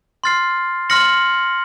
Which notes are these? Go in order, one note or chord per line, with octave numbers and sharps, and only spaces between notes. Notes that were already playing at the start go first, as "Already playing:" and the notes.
C6 F6 A6 C7
C6 F6 A#6 C#7 F#7